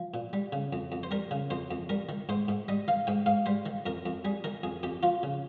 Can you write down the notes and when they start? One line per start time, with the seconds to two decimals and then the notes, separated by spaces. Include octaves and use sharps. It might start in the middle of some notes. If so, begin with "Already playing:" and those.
Already playing: F3
0.14 A#2
0.33 G3
0.52 C#3
0.73 F2
0.92 F2
1.03 C5
1.11 G3 A#4
1.31 C#3
1.50 F2 C5
1.71 F2
1.89 G3 A#4
2.09 D#3
2.29 G#2 C5
2.48 G#2
2.68 G3 D#5
2.88 D#3 F5
3.07 G#2 G5
3.26 G#2 F5
3.46 G3 C5
3.66 D#3
3.86 F2 A#4
4.06 F2
4.25 G3 G#4
4.44 D#3 A#4
4.63 F2 G#4
4.83 F2 G4
5.03 F3 F4
5.23 C#3